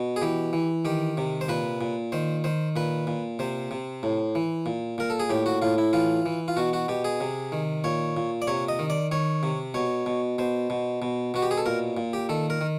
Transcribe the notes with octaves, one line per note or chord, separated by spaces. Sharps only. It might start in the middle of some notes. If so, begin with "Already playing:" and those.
Already playing: B2
G#4
E3 G4
E3
D#3 G4
C3
C5
A#2 B4
A#2
D#3 C5
D#3 C5
A#2 B4
A#2
C3 C5
C3
A2
E3
A#2
A#2 A#4
A4
G#4
A2 G4
F#4
A2 F4
E4
E3 F4
E3
F4
B2 F#4
F#4
B2 G4
G#4
C3
D#3
A#2 C#5
A#2
D5
C3 C#5
D#5
D#3
D5
D#3 C#5
C3
B2 C#5
B2
B2 C5
B2
B2
B2 F#4
G4
G#4
A4
A#2 A#4
A#2
G4
D#3 A4
A#4
D#3